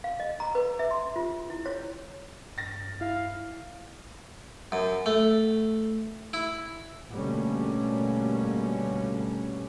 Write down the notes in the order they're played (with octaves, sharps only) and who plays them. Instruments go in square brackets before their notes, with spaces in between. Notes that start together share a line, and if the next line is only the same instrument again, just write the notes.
[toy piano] F5
D#5
A#5
B4
E5
C6
F4
E4
C#5
[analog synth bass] G2 [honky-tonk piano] A6 A#6
[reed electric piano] E4 [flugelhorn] F5
[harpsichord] F#2
A3
E4
[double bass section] B2 D3 G3 A3 A#3 C#4